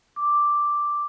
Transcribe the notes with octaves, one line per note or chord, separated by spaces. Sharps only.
D6